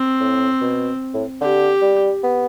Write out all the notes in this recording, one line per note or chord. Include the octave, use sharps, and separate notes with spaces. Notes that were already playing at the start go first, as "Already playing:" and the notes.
Already playing: C4
A2
B2
A2
D3 G4
G3
B3